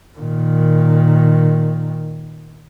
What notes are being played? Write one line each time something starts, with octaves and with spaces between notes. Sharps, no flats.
A#2 D#3